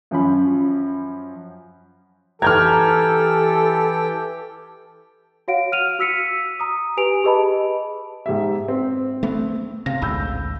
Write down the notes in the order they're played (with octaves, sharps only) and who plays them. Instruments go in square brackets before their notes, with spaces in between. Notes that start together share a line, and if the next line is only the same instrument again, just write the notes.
[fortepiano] F#2 F3 C#4 B5
[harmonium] E3 G4 G5 [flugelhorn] A4 [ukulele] A#5 [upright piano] F6 G6 G#6
[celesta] F#4 C#5 F5 F#5 D7
F6 D#7 F7
F#4 E6 B6 C#7 D#7
A#5 D#6
G4 B4 G#5 D7 F7
G4 G#4 B4 D#5 A5 B5
[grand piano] G#2 G4 E5
C4
[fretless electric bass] A3 B3
[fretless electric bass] C3 [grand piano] F5 A#6
[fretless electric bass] A1 D2 G#2 [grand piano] B5 E6 G6